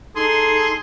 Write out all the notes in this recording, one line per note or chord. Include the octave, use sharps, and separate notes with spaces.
D#4 G#4 A4 C6